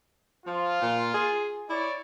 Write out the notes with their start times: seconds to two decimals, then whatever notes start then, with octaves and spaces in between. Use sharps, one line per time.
0.46 F3 F4
0.82 A#2
1.14 G#4
1.69 E4 C#5 D5